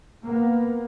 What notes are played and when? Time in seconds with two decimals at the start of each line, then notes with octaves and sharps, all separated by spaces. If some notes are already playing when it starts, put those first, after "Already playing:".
0.24 A#3 B3